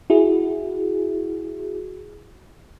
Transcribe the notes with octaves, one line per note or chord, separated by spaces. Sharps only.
E4 F#4 G#4